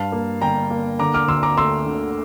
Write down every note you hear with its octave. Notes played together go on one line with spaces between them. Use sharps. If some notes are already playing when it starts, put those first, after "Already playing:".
Already playing: G2 F5 A5
A#3
G1 G5 A#5
A#3
D3 A#5 D6
D6 F6
D2 C6 E6
A#5 D6
A3 C6 E6
D3